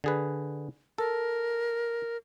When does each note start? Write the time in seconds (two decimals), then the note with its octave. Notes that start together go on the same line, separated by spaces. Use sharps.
0.04 D3 G#4 B4
0.98 A4 A#4